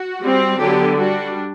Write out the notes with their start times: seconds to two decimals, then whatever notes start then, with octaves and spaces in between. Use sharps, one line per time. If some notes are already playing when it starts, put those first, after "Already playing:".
Already playing: F#4
0.20 G3 C4
0.58 D3 F#3 B3 G4
0.98 G3 D4 F#4